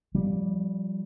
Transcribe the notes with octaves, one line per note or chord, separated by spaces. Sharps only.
F3 G3